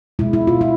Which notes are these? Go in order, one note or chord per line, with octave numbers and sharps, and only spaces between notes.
B2 G#3 E4
E4
F4
E4